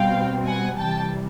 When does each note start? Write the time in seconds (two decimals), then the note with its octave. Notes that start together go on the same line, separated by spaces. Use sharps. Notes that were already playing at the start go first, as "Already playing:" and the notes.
Already playing: B2 G3 C4 F5 G5
0.46 F#5 G#5
0.77 C3 E3 G3 G5 A5